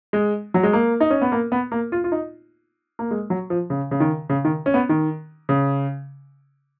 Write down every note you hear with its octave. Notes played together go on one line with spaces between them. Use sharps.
G#3
F#3
G#3
A#3
D#4
C#4
B3
A#3
B3
A#3
F4
F4
D#4
A#3
G#3
F#3
F3
C#3
C#3
D#3
C#3
D#3
C#4
B3
D#3
C#3